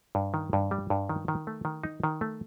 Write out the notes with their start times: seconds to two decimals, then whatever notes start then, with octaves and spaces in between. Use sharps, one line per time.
0.15 G2
0.34 D#3
0.53 G2
0.71 G3
0.90 G2
1.09 D#3
1.28 D#3
1.47 A3
1.65 D#3
1.84 D#4
2.04 D#3
2.21 A3